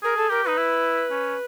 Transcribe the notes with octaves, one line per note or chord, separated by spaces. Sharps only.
G#4 A#4
A4
G4 A#4
D#4 B4
E4
C#4